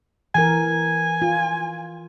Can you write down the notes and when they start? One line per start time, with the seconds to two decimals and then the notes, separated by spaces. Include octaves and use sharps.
0.35 E3 A#4 G#5
1.22 F4